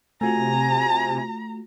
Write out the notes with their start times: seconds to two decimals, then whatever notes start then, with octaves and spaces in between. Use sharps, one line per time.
0.21 C3 A3 F4 F#4 G#5 A#5